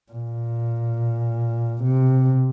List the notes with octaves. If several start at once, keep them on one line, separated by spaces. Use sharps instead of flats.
A#2
C3